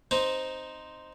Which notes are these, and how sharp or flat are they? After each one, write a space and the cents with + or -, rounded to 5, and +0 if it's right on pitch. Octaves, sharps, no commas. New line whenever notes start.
C4 +0 D#4 +0 C5 +0